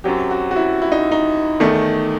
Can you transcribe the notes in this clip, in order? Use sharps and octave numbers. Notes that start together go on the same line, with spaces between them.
F#2 F#3 C4 G4
F#4
F#4
E4
E4
D#4
D#4
E2 D#3 A3